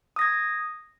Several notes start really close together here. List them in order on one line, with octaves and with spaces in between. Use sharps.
D#6 A#6 G#6